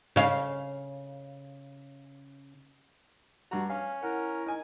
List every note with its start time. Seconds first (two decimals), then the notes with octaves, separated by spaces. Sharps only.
0.16 C#3 F5
3.51 G2 F#4 A#5
3.70 C#4 F5
4.03 E4 A#4 F#5
4.46 D#4 G#5